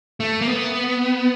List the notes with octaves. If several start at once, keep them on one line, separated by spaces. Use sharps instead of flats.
A3
A#3
B3